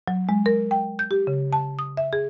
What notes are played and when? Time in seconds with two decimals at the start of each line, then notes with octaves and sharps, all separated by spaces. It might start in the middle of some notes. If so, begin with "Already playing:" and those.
0.08 F#3
0.29 G#3
0.46 A#4
0.71 G5
0.99 G6
1.11 G4
1.27 C#3
1.53 A5
1.79 D#6
1.97 E5
2.13 G#4